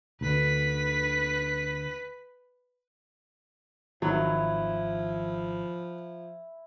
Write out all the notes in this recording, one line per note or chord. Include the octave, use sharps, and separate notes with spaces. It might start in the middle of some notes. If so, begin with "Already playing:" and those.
D2 D3 B4 B6
G#1 D#3 F3 F#3 E4